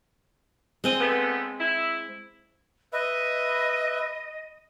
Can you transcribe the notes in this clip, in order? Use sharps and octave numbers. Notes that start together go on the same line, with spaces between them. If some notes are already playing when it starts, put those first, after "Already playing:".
G#3 C4 D#5
D3 A3 B3
E4
B4 D#5 E5